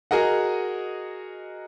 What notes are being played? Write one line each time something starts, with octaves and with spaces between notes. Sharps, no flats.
F#4 G#4 A#4 D#5 F#5